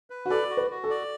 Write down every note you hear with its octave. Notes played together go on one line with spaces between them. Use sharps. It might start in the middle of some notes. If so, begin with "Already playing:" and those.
B4
F#4
A4 D5
F#4
B4
F#4
A4
D5